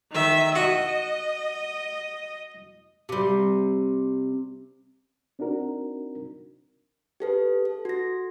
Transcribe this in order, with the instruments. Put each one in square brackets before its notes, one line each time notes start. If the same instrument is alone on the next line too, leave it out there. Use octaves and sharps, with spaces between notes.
[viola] D#3 E5
[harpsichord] F#4 [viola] D#5
[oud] C3 G3
[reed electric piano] C4 D4 D#4 F#4 A#4
[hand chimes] G4 A4 B4
A4
F#4 A#6